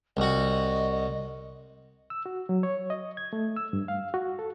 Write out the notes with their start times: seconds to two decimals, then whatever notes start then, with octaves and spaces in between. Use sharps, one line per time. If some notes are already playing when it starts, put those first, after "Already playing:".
0.17 C2 F#4 D#5
2.10 E6
2.26 F#4
2.49 F#3
2.63 C#5
2.90 D#5
3.17 G#6
3.33 A3
3.56 E6
3.73 G2
3.88 F5
4.14 F#4
4.39 A4